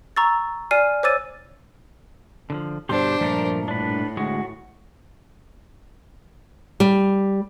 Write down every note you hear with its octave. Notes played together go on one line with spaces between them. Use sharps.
A#5 C#6 E6 A6
D5 G#5 F6 C7 D#7
C5 C#5 D6 E6 A6 D#7
D3 E3 F3
G2 B2 D3 D4 G4 C5 C6
G2 A#2 F3 A3 A#4
A2 D4 B4
D2 G#3 F#4
G3